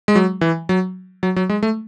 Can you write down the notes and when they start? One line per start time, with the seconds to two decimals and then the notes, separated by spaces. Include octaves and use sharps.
0.08 G#3
0.16 F#3
0.41 E3
0.69 F#3
1.23 F#3
1.36 F#3
1.49 G#3
1.63 A3